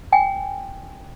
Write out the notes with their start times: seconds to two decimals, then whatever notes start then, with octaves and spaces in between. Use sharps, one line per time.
0.12 G5 G#5